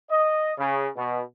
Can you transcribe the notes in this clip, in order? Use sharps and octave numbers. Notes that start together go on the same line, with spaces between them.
D#5
C#3
B2